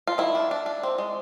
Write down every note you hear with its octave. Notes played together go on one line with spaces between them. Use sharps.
F4
D#3 E4
D4
D4
D4
C4
G#3